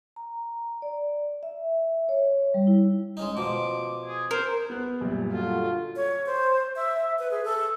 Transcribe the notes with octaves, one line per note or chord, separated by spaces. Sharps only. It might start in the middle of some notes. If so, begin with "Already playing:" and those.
A#5
D5
E5
C#5
G3
E4
G#3 C#4 D#4
B2 F3 D6
G#4
A#4 C5
B3 F#6
F#2 A#2 G3
D3 F4 F#4 A4
C#5
C5
E5
B4
G#4
A4